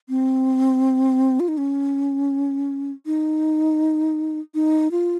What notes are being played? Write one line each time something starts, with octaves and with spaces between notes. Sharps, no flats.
C4
F4
D#4
C#4
D#4
D#4
F4